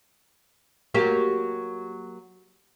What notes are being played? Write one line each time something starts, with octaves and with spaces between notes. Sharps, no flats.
F#3 A#3 G4